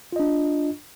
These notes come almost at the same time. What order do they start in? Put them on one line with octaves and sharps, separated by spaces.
F4 D#5 D4